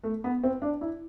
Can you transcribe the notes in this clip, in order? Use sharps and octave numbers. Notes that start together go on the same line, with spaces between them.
A3
B3
C4
D4
E4